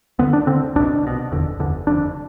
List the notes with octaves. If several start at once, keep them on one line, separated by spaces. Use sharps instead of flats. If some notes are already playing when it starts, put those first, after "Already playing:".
D2 D3 B3
D4
D2 D3 C4
C2 B2 D4
C2 B2
F1 E2 D3
F1 E2 D3
F1 F2 D3 D4